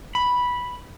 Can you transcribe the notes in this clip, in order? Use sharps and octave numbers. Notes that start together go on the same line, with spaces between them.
B5